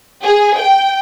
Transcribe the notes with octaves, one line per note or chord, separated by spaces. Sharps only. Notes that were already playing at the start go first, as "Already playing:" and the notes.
G#4
G5